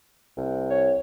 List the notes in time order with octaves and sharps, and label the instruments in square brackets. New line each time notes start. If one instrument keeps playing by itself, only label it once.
[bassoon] C2
[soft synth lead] C#5